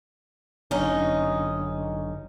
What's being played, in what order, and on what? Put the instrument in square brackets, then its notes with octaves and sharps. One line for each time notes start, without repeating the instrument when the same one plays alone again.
[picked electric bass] G1 F#2 D3 [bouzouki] C#4 D#4